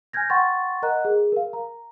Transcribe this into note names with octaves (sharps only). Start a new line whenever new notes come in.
G#5 F6 G6 G#6 A#6
F#5 G5 C6 C#6 A6
A#4 D#5 F#5 A#5 F#6
G#4
A#4 F5
A#5